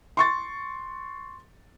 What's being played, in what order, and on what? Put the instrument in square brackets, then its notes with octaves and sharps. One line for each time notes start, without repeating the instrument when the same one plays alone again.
[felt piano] C6 C#6 A6